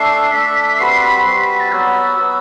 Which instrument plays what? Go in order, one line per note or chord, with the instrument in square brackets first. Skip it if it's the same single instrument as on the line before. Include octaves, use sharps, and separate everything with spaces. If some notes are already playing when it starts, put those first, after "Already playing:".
Already playing: [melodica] A3 D4 A4 E5 [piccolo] C7
[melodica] A3 D4 A4 E5 [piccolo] B6
[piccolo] B6
[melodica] G3 C4 F#4 B4 [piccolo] C7
[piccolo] B6
[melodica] G3 C4 F#4 B4 [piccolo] C7
[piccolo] B6
B6
A6
[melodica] F#3 B3 F#4 [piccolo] E6
[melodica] F#3 B3 F#4